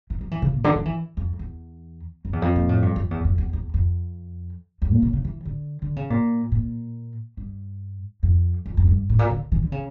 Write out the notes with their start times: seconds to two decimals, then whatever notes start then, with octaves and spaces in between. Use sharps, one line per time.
0.10 E3
0.21 F3
0.31 E3
0.42 C#3
0.54 A#2
0.64 D3
0.75 F3
0.85 E3
1.17 F2
1.39 E2
2.25 F2
2.33 E2
2.42 F2
2.56 A#2
2.69 A2
2.82 G2
2.96 F2
3.11 E2
3.24 F2
3.38 E2
3.53 E2
3.74 F2
4.82 E2
4.92 A#2
5.02 C#3
5.13 C#3
5.25 E3
5.45 D3
5.82 D3
5.96 C#3
6.10 A#2
6.52 A#2
7.37 G2
8.23 F2
8.66 F2
8.77 F2
8.87 G2
9.10 A2
9.19 A#2
9.31 D3
9.52 E3
9.63 D3
9.72 C#3